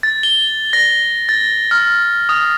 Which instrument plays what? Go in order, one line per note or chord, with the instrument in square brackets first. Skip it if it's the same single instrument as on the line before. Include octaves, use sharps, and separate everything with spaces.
[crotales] A6
G7
A#6
A6
F6
D#6